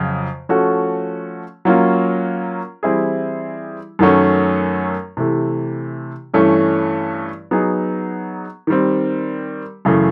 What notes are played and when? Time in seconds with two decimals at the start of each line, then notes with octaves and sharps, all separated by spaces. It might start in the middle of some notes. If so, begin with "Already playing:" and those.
Already playing: F2 C#3 F#3
0.49 F3 A3 C#4 F#4 A4
1.65 F#3 A#3 C#4 F4
2.83 E3 G3 C4 E4 G#4
3.99 F#2 D#3 F#3 A3 C#4
5.17 C3 E3 A3
6.34 G2 E3 A3 C#4
7.51 F#3 B3 D#4 G#4
8.67 D#3 G3 C4
9.85 F#2 C#3 E3 A3